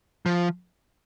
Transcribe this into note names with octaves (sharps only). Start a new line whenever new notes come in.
F3